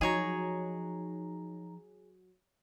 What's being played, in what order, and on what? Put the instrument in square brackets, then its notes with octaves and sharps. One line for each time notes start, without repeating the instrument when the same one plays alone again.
[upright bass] F3 [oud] F#3 [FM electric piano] D#4 A#5 [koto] G#4 C#5